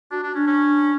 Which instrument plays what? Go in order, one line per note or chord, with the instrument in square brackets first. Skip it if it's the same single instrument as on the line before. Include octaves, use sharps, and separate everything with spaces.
[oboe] D4 [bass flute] F#4
[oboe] D4
[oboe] C#4 [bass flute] D4
[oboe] C#4